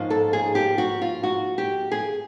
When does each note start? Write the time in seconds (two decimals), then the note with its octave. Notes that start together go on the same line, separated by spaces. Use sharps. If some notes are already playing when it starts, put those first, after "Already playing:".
Already playing: G#2 F3 A#3 C#4 F4
0.10 A4
0.33 G#4
0.55 G4
0.78 F#4
1.02 F4
1.23 F#4
1.58 G4
1.92 G#4